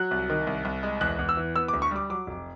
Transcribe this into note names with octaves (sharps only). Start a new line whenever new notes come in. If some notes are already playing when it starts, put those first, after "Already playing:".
Already playing: F#3 F#6
C2
D#3
C2
C2
G#3
E2 F#6
E2
E6
E3
B3 E6
D6
D2
C#6
G3 D6
F#3 D6
F1